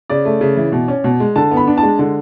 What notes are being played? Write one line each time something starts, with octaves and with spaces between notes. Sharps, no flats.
C#3 D5
A3
C#3
E3
B2
C#4
B2
G#3
D3 A5
B3
B5
D4
A5
G#3
D3